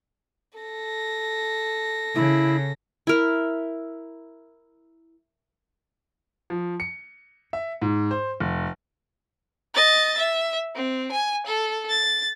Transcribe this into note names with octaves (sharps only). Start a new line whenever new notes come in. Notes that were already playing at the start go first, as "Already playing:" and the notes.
A4 A#6
C#3 E4
E4 A#4
F3
C#7
E5
G#2
C5
F1
D#5 A6
E5
C4
G#5
A4
A6